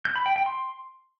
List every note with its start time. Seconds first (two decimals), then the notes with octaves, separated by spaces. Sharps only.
0.05 G6
0.16 B5
0.26 G5
0.36 G5
0.46 C6